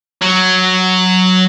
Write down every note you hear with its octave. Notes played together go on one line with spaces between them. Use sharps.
F#3